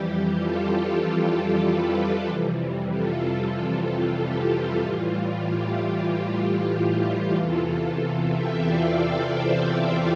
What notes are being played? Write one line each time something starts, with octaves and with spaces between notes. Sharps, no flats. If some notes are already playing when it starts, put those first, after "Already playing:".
Already playing: F2 E3 G3 G4
F4 A4
G4 B4
F2 C3 E3 G3
F4 A4
G4
F4
A2 E3 G3 F4
G4
E2 C3 E3 F4 A4
F4 A4
E5 G5
D5 F5
E5 G5
C5 E5